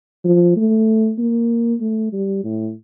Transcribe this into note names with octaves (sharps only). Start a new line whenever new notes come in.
F3
A3
A#3
A3
G3
A2